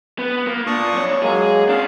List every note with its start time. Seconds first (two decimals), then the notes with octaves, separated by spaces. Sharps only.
0.19 B3
0.47 A#3
0.67 A#2 D4 C#6 D#6
0.94 F2 C#5
1.23 F#3 G#3 A#3 G#4
1.69 C#4 D4 F5